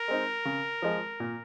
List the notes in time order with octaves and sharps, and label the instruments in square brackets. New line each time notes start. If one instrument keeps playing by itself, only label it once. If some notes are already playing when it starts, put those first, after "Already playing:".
Already playing: [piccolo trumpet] A#4
[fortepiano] G#3 C4 D#4
C#3
F3 G#3
A#2